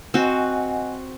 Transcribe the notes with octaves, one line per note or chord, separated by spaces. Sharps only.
C4 F#4 D#5 F#5 G#5